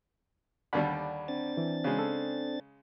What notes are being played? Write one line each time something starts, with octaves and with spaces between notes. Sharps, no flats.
D#2 D3 G3 D5 F#5 B5
C4 D4 A6
E3
C#3 G#3
A4